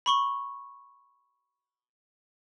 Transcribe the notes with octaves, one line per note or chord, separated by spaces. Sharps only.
B5 C#6 G7